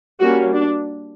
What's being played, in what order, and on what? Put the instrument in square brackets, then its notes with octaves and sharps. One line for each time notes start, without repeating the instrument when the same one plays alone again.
[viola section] G3 A#3 C#4 F#4
D4